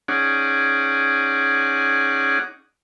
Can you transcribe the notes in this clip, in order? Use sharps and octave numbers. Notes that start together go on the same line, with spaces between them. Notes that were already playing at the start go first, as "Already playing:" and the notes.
C#4 D#4 G#4 D5 F#5